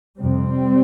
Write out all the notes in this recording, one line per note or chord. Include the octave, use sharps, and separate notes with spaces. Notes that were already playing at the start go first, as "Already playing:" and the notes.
F2 C3 G3 C4